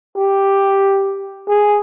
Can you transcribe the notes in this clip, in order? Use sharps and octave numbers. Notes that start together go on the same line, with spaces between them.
G4
G#4